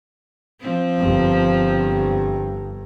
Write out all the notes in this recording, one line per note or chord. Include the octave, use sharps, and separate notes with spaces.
F3 C4
G1 G2